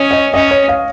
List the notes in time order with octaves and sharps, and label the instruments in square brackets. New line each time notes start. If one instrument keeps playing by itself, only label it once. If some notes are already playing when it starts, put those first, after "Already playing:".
Already playing: [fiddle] C#4 [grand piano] C#5 D#5
[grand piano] D#5
[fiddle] C#4 [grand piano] D#5
[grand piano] C#5
C#5 F5